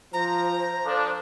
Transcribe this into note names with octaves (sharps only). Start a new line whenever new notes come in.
F3 C5 A#5
F3 D4 A4